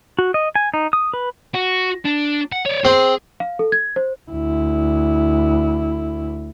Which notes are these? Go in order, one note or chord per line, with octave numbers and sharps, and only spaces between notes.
F#4
D#5
G#5
D#4
D#6
B4
F#4
D4
F#5
C#5 D5
C4 G#4
F5
A4
G#6
C5
D2 E4